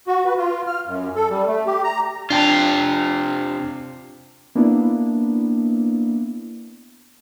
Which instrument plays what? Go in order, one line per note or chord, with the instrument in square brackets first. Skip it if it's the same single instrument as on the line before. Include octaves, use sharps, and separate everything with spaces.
[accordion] F#4
B4
F4
F6
F#2
A4
G3
A3
G4
A#5
[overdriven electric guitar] C3 F4 [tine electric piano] D4 G5 A5
[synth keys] A#3 B3 D4 E4